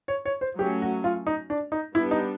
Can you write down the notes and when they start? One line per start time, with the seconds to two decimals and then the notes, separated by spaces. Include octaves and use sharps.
0.08 C#5
0.25 C#5
0.41 C5
0.59 F#3 A3 C#4 G4
0.82 F#4
1.04 F4
1.27 D#4
1.50 D4
1.72 D#4
1.95 G3 B3 D4 E4
2.11 D#4